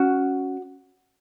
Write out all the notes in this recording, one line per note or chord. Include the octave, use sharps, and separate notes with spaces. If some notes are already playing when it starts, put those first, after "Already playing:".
Already playing: C#4 F#4